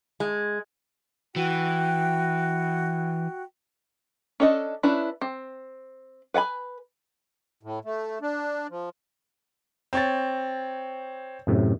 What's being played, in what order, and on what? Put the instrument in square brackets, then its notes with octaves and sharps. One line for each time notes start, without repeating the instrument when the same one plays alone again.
[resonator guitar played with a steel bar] G#3
[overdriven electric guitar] E3 [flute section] F#4 G5
[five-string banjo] C#4 D4 A4 D#5
C#4 D4 E4 B4
C4
B4 F#5 G#5 B5
[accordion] A2
A3
D4
F3
[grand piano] C4 C#5 A6
[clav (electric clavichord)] F#2 A2 C3